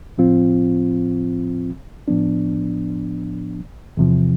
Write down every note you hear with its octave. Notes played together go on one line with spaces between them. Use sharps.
A2 F3 C4 F4
A2 F3 B3 D4
E2 C3 F3